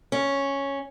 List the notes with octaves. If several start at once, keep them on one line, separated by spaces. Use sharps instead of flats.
C#4